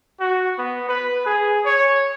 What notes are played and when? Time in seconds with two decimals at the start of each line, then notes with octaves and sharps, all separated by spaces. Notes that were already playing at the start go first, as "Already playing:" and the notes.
0.20 F#4
0.58 B3
0.89 B4
1.26 G#4
1.65 C#5